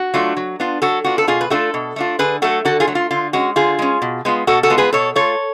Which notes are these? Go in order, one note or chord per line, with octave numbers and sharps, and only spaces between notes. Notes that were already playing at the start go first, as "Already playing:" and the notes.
Already playing: F#4
F#3 A3 D4 F4
F#3
B3 D4 F4
F#3 F#4 A4
B3 D4 F4 F#4
A4
B2 F4 G#4
B4
A3 D4 F4 F#4 A4
B2
A3 D4 F4
D3 G#4 B4
F#3 A3 F#4 A4
D3 F#4 A4
F4 G#4
F#3 A3
F4
D3 F4
G#3 C#4 F#4
D3 F4 G#4
G#3 C#4
B2
G#3 B3 F4
B2 F#4 A4
F#4 A4
G#3 B3 F4
G#4 B4
B2 A4 C#5
A3 F4 A4 C#5